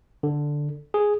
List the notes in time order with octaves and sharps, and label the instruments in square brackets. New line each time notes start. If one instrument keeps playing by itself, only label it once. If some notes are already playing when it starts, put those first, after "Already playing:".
[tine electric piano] D3
G#4